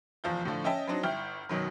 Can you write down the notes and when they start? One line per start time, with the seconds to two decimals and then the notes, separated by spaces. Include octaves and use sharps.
0.24 F1 E2 F3 F4 G6
0.45 A2 D3 F3
0.64 C#4 D#5 E5 G5 A5
0.87 F#3 C4 D4 D#4
1.03 G1 E4 G5 F6 G6
1.49 F#2 B2 D#3 F#3